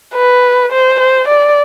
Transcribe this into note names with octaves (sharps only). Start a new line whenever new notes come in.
B4
C5
C5
D5